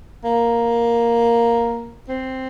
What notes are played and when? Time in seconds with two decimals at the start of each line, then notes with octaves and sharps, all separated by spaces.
0.24 A#3
2.09 C4